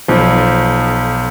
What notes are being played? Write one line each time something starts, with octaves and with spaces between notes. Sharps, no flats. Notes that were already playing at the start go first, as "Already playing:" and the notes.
B1 F3